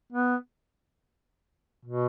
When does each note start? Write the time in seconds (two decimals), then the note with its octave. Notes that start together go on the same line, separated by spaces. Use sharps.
0.13 B3
1.85 B2